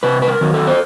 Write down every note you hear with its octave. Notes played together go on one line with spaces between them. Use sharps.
C3 B4
B4
A#4
D#3 F#3
A4
C5